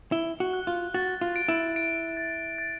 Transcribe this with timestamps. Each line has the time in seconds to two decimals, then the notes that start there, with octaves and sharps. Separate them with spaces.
0.12 E4 G7
0.40 F#4
0.53 F#6
0.67 F4
0.94 F#4 A6
1.21 F4
1.36 D7
1.48 E4
1.76 D7
2.17 A6
2.58 A6